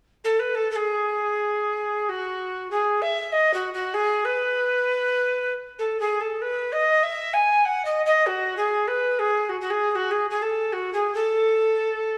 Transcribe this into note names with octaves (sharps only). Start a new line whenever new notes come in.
A4
B4
A4
A4
G#4
F#4
G#4
E5
D#5
F#4
F#4
G#4
B4
A4
G#4
A4
B4
D#5
E5
G#5
F#5
D#5
D#5
F#4
G#4
B4
G#4
F#4
F#4
G#4
G#4
F#4
G#4
G#4
A4
F#4
G#4
A4